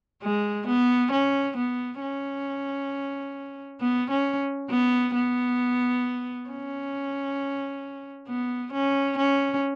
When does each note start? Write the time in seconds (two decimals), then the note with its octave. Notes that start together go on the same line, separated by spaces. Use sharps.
0.23 G#3
0.67 B3
1.12 C#4
1.57 B3
2.01 C#4
3.80 B3
4.11 C#4
4.70 B3
5.14 B3
6.49 C#4
8.27 B3
8.73 C#4
9.18 C#4